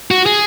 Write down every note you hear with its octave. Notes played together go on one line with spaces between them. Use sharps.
F#4
G#4